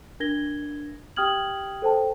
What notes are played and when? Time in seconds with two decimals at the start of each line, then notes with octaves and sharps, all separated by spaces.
0.20 D4 A#4 G#6 A#6 G7
1.16 G4 G5 D#6 F6 G#6 F#7
1.82 A4 C5 G5 A5